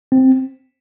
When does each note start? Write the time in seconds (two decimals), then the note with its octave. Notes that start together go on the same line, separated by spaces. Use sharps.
0.12 C4